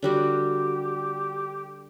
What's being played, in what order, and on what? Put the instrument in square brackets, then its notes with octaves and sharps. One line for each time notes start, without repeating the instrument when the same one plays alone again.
[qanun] D3 G3 F#4 [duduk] G4